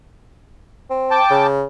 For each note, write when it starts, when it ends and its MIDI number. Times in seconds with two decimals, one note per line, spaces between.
0.90 1.19 60
1.11 1.47 79
1.11 1.47 81
1.11 1.47 86
1.30 1.65 49